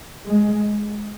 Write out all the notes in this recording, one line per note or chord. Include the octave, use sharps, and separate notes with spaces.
G#3